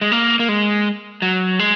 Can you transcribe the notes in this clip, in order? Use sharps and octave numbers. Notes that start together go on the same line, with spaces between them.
G#3
A#3
A#3
G#3
F#3
G#3